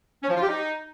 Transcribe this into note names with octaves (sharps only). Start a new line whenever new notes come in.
C#4
F3
F4
G4
D#4